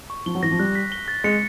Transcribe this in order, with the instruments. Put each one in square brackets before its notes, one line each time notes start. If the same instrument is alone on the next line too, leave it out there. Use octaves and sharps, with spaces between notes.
[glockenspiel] C#6
[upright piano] F3 [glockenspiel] G7
[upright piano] F#3
[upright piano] E3 [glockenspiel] A#6
[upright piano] F3
[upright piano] G3 [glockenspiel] F#6
[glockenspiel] B6
G7
A6
[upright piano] G#3 [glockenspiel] C#7